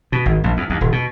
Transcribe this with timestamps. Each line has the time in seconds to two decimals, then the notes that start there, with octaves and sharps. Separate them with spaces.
0.12 B2
0.26 G#1
0.44 A#1
0.57 E2
0.70 D#2
0.81 D#1
0.92 B2